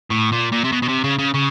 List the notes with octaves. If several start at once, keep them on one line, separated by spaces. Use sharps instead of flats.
A2
A#2
A#2
C3
B2
B2
C3
C#3
C#3
C#3